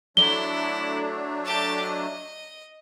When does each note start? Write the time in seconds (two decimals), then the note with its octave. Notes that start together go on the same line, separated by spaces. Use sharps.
0.17 F#3 A3 D4 E4 G7
1.45 G4 A5
1.82 D#5